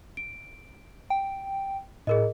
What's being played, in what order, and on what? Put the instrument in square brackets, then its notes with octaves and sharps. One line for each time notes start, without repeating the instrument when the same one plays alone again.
[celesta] D7
[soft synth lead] G5
[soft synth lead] A2 [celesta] G#4 A#4 D#5